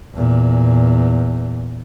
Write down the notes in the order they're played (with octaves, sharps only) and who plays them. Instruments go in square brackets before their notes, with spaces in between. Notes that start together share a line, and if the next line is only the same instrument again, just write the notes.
[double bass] E2 A#2